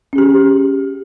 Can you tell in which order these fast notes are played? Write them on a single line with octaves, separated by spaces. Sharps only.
C#4 G#4 G4